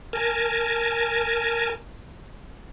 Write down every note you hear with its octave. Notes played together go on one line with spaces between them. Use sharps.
A#4 G#5 A5